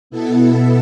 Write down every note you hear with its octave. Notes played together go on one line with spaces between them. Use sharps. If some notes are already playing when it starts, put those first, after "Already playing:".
B2 B3 E4 A4